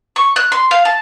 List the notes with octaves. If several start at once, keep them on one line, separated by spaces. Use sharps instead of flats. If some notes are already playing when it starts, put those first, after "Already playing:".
C#6
F#6
C6
F5
A5